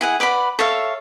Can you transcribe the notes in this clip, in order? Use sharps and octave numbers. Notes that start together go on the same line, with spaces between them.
E4 G#4 F#5
B4 D5 F#5 B5
A4 C#5 E5 F5